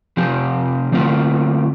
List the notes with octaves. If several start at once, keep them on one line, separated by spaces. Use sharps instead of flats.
C3 F3 C4 G4
D3 A3 C4 F4